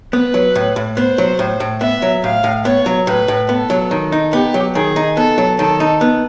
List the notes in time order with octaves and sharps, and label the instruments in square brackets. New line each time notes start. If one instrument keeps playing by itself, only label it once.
[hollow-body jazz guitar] B3 [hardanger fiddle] B4
[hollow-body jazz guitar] F#3
A2
A2
[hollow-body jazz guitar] B3 [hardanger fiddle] C5
[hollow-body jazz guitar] F#3
A2
A2
[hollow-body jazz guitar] B3 [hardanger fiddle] E5
[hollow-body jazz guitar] F#3
[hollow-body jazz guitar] A2 [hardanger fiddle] F5
[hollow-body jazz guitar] A2
[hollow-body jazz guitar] B3 [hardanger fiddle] C#5
[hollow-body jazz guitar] F#3
[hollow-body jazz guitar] A2 [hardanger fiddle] B4
[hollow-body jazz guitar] A2
[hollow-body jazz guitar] B3 [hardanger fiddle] A4
[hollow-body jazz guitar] F#3
D#3
D#4
[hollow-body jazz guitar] B3 [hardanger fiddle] G4
[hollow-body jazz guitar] F#3
[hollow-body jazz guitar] D#3 [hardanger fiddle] G#4
[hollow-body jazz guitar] D#4
[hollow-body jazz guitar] B3 [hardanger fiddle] A4
[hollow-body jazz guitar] F#3
[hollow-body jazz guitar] D#3 [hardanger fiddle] A4
[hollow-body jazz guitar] D#4
B3